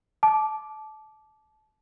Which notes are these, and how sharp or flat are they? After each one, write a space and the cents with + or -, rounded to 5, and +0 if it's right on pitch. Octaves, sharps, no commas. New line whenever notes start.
A5 -25 D6 +0